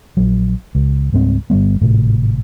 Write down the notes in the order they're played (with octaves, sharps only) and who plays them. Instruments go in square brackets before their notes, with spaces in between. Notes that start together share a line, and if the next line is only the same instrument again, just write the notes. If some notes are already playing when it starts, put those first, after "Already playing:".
[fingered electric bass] A#1 F#3
C#2
C#2 G#2 G3 C4
G1 C2 G3 B3
G#1 A2 C3 A3